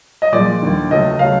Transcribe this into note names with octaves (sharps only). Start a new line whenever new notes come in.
D#5
A#2 F3 G#3 D5
D#2 D3 G3
C#2 C#3 F#3 A3 D#5
C#3 F#3 A3 F5